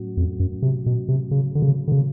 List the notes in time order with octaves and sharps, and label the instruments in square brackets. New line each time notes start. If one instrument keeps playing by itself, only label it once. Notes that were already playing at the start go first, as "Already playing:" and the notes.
Already playing: [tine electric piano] A2 F#3 A3 C#4 F#4
[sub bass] F2
F#2
C3
B2
C3
C#3
D3
C#3
D3
C#3